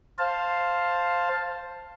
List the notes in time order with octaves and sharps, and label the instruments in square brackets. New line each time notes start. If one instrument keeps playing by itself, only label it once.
[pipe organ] C5 F5 A5